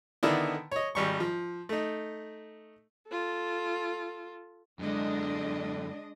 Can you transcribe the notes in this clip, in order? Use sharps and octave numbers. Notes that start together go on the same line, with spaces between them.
D3 D#3 B3 D4 E4
C#5 D#5
G#1 G3 C#6
F3
A3 D#4
F4 A4
F#2 D3 G#3 D4 D#5